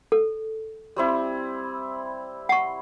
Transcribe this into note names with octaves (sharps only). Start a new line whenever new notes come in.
A4
G3 C4 E4
F#5 C#6